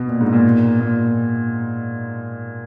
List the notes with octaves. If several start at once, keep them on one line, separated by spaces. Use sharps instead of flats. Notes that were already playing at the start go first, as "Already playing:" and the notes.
Already playing: B2
A#2
G#2
A#2
A#2